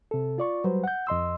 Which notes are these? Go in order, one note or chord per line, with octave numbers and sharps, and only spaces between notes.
C3 A4
F4 D5 C#6
F#3 G3 B4 C5
F#5 G6
F2 D#5 C6 E6